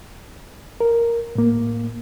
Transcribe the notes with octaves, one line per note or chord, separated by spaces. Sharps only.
A#4
A2 A#3